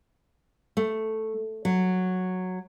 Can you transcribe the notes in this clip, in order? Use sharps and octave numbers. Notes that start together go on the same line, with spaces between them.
A3
F#3